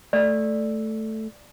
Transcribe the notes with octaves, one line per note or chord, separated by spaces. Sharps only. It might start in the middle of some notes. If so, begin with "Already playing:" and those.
A3 D5